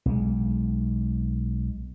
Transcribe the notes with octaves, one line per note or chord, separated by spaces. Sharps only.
B1 G#3